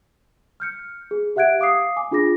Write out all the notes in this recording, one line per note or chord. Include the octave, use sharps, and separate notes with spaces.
F6 G6 C#7
G#4
G4 E5 F#5 F#6 G#6 D7
F5 D6 D#6 C7
G#5 D6
D4 F4 G#4 D6 A#6